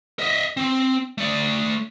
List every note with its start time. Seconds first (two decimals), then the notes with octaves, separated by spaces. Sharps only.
0.19 D#5 E5
0.57 C4
1.18 A3 D5